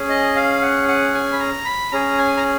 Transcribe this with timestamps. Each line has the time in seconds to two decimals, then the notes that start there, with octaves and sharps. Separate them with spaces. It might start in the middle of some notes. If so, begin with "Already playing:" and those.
Already playing: C#4 G#4
0.09 D#5
0.36 F5
0.62 F#5
0.88 F#5
1.14 G#5
1.33 B5
1.39 A#5
1.65 B5
1.92 C#4 G#4 A#5
2.18 G#5
2.37 A#5